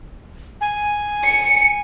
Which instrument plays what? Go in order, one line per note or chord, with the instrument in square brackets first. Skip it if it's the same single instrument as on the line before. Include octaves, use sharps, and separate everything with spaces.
[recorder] G#5
[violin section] C#7